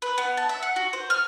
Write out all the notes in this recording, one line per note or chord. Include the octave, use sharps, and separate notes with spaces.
B4
B3
A5
E5
F#5
F#4
C5
F6